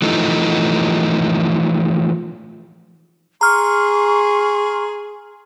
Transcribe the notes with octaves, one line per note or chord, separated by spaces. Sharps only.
E3 F3 A3 D#4
G#4 A#5 C6 C#6 F6